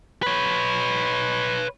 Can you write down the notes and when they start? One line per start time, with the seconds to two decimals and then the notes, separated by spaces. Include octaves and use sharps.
0.23 B4 C#5